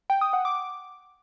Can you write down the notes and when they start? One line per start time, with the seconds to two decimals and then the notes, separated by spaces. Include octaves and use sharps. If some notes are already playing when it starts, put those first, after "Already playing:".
0.10 G5
0.21 D#6
0.33 F#5
0.45 D6